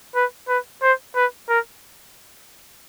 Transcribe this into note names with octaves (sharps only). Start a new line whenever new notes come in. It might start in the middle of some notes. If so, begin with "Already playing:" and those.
B4
B4
C5
B4
A#4